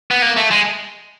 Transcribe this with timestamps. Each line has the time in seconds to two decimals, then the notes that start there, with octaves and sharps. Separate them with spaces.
0.11 B3
0.22 A#3
0.37 A3
0.51 G#3